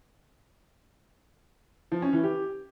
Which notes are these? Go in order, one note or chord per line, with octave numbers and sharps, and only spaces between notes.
F3
C#4
E3
G4